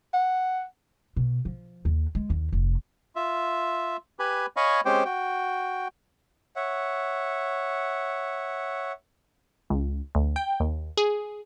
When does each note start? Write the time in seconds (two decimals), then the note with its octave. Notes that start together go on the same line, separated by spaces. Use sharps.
0.14 F#5
1.16 B2
1.45 F3
1.85 D#2
2.15 G#3
2.30 D#2
2.53 F1
3.16 F4 E5
4.19 G4 B4 G#5 B5
4.57 C#5 D#5 F5 G#5 B5 C#6
4.85 G#3 C4 C#4 G4 C5 G5
5.05 F#4 G5
6.56 C#5 E5 F#5
9.70 C#2
10.15 D2
10.36 G5
10.60 D#2
10.97 G#4